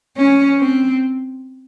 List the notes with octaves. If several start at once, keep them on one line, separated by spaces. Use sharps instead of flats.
C#4
C4